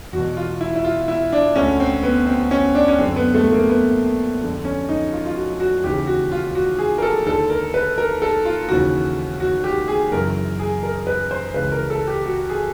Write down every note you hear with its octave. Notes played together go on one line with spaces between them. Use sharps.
E2 B2 F#4
F4
E4
E4
F4
E4
D4
D2 D3 C#4
C4
B3
C4
C#4
D4
C#4
F#2 D3 C4
B3
A3
A#3
B3
F2 D3
C#4
D#4
F4
F4
F#4
F#4
D#2 C#3 E3 G4
F#4
F4
F#4
G#4
A#4
A4
D#2 D3 A4
A#4
B4
A#4
A4
F4
D#2 C#3 E3 F#4
F#4
G4
G#4
F#2 C#3 E3 A#4
G#4
A#4
B4
C5
C#2 C#3 E3 B4
A#4
A4
G4
F#4
G#4